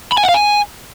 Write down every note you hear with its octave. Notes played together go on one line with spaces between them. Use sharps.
B5
G#5
F#5
F5
G#5